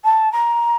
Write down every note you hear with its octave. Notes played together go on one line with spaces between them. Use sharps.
A5
A#5